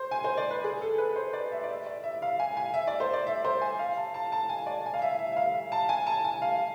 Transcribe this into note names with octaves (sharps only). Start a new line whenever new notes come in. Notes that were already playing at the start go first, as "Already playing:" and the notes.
Already playing: C5
G#5
C5
D5
B4
G#4
A4
B4
C5
D5
E5
D5
E5
D5
E5
F5
G#5
G#5
E5
D5
C5
D5
E5
C5
G#5
F5
A5
A5
A5
G#5
D5
G#5
F5
E5
E5
E5
F5
A5
G#5
A5
G#5
F5